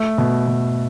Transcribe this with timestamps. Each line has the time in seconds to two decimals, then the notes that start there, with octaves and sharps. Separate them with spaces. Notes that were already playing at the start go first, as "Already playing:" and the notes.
Already playing: A3
0.18 B2
0.47 B2